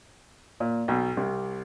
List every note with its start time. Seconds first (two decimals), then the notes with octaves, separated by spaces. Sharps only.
0.60 A#2
0.88 B1 B2
1.17 C2 C3